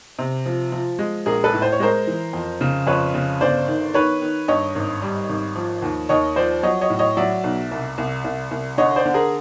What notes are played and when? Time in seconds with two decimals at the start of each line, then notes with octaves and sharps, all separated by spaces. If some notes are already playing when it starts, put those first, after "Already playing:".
0.19 C3
0.46 F3
0.72 F3
0.99 G#3
1.26 A#1 G#4 A#4
1.44 A4 B4
1.54 A2
1.62 C5
1.72 C#5
1.80 G#3 A#4 C5
2.07 E3
2.33 F2
2.61 C#3
2.87 F2 B4 C#5
3.14 C#3
3.41 G1 C5 D5
3.68 D#3
3.94 D#3 B4 C#5
4.22 D#3
4.48 G2 C#5 D#5
4.75 G#1
5.02 G3
5.29 G#1
5.56 F3
5.82 D#2
6.09 D#2 C#5 D#5
6.36 F3 C5 D5
6.63 F#3 C#5 D#5
6.81 C#5 D#5
6.90 A2
6.99 C#5 D#5
7.17 F#3 D5 E5
7.44 B1
7.71 C2
7.98 C2
8.24 C2
8.51 C2
8.78 D3 C#5 D#5
8.96 C5 D5
9.05 D3
9.14 G#4 A#4